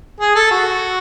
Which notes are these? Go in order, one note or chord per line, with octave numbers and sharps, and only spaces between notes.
G#4
A4
F#4